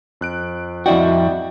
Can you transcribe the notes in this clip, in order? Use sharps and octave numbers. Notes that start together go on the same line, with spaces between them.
F2 F#6 D7
F2 E4 F#4 D5 D#5 G5